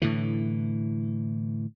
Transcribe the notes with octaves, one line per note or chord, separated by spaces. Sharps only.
A2 D3 E3